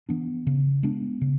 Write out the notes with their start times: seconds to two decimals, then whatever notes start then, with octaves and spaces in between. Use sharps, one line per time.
0.09 E3 B3 D4
0.47 C#3
0.83 G#3 B3 D4
1.21 C#3